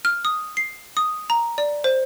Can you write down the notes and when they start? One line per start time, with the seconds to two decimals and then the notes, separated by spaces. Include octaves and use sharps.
0.05 F6
0.25 D#6
0.57 C7
0.97 D#6
1.30 A#5
1.58 D5
1.84 C5